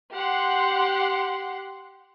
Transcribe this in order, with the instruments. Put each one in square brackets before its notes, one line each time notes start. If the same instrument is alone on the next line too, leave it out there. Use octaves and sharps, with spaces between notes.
[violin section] G4 F#5 C6